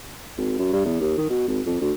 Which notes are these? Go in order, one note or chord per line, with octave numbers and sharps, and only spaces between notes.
G#1
F#2
G2
E2
D#2
D#3
B2
G#1
F2
D2